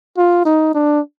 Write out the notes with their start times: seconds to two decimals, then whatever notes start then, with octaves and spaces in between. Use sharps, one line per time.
0.18 F4
0.45 D#4
0.75 D4